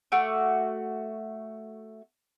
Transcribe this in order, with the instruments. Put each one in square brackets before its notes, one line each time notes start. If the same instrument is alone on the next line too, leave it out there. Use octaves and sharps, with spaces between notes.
[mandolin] A3 F#4 D6